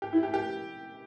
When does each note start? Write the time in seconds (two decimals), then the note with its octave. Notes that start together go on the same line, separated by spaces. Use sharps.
0.02 G4
0.13 E4
0.23 G4
0.34 G4